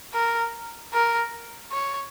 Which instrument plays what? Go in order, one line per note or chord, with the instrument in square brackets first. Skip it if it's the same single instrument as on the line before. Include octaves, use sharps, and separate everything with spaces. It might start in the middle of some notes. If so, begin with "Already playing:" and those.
[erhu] A#4
A#4
C#5